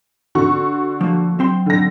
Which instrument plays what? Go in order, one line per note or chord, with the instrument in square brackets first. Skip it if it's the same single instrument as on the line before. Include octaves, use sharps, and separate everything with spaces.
[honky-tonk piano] D3 F#4 C#6
[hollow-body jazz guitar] F3 A#3
F#3 C4 C6
[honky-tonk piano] D3 A#6